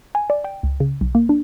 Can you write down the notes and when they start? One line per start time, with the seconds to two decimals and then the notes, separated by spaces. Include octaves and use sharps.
0.15 G#5
0.30 D5
0.44 G5
0.63 C#2
0.80 C#3
1.01 B1
1.15 A#3
1.29 D4